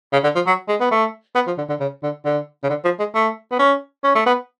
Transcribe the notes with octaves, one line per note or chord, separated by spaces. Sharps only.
C#3
D3
F3
F#3
G#3
B3
A3
B3
F3
D3
D3
C#3
D3
D3
C#3
D3
F3
G#3
A3
B3
C#4
C#4
A3
B3